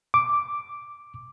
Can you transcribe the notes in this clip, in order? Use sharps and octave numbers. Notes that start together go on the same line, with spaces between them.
D6